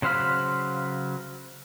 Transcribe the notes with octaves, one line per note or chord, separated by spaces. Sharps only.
C#3 F#3 C5 F5 B5